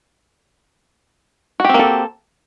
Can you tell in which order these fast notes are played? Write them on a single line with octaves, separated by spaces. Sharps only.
F#4 G4 C4 A#3 A4